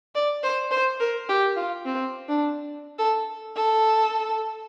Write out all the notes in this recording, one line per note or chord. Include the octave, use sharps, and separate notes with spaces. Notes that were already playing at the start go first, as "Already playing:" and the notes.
D5
C5
C5
A#4
G4
F4
C4
D4
A4
A4